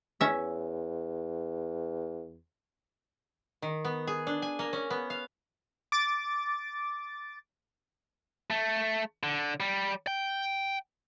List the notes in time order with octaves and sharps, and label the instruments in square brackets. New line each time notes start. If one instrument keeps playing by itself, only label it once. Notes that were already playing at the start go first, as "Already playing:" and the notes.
[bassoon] E2 [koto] C#4 E5
[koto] D#3
B3
G#4
D4
G#5
A#3
C#4
B3
F5
[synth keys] D6 A6
[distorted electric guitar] A3
D3
G3
G5